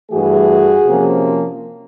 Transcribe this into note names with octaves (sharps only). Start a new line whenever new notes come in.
G2 E3 A3 F#4 G#4
C3 F3 A#3 C#4